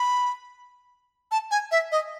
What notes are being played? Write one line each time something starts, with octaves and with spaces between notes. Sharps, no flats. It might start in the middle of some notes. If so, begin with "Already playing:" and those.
Already playing: B5
A5
G#5
E5
D#5